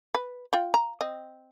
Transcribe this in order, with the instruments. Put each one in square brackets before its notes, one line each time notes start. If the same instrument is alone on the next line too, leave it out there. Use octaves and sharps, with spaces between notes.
[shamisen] B4
F4 G5
A#5
C4 D#5